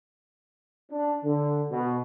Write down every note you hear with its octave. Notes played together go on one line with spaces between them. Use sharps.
D4
D3
B2